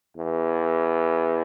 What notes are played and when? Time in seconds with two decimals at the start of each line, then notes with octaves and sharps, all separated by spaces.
0.17 E2